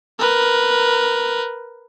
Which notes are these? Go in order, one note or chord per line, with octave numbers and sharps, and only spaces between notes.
A#4 B4